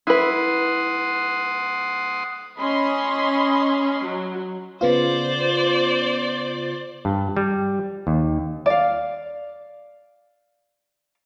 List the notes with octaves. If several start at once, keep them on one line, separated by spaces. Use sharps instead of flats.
E4 B4 F#5 C6 D#6
C#4 D#5 B5 C6
F#3
C#3 B3 F4 C5 D5
G2
G3
D#2
D5 F5